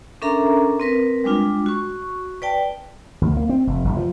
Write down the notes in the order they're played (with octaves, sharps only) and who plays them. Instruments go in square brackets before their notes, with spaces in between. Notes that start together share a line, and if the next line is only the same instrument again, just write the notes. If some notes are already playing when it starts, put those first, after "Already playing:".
[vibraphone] C#4 D4 A4 A#4 E5 A#5
C4 A#4 B4
G3 G#3 D4 F4
F#4 C#6
B4 D5 G5 A5
[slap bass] D2
A#3
C4
F1
F1
F3